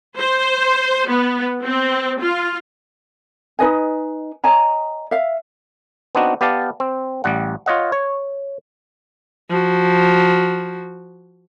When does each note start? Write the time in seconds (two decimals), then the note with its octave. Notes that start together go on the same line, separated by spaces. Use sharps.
0.18 C5
1.09 B3
1.63 C4
2.22 F4
3.59 D#4 B4 D#5 G#5
4.44 C#5 D#5 G#5 A#5
5.11 E5 F5
6.15 B3 C4 D4 D#4 F#4
6.41 B3 G4 D5 F5 A5
6.80 C4
7.24 A1 G3 F#5
7.66 F4 C#5 D#5 F#5
7.92 C#5
9.49 F3 F#4